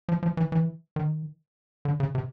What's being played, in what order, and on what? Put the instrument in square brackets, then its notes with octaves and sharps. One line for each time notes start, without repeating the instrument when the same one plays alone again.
[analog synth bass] F3
F3
E3
E3
D#3
D3
C#3
C3